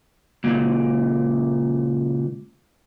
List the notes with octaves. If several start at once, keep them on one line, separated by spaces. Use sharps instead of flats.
C#2 A#2